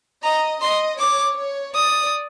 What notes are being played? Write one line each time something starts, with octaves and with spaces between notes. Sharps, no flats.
D#5 A#5
D#5 C6
C#5 D6
C#5
D5 D#6